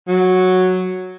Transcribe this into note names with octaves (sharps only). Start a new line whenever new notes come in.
F#3